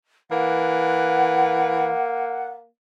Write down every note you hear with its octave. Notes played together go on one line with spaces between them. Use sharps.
E3 A#3 F#5